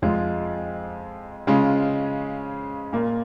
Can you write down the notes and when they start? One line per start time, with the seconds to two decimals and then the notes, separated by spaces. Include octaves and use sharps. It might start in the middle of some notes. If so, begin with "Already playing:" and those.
0.02 F2 F3 G#3 F4
1.47 C#3 G#3 C#4 F4
2.93 A#2 A#3 F4